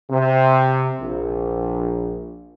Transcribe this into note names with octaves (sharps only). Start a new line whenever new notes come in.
C3
A#1